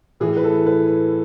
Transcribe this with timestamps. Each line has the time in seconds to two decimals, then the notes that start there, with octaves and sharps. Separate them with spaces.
0.20 A2 E3 G#4
0.37 B4
0.44 A4
0.66 B4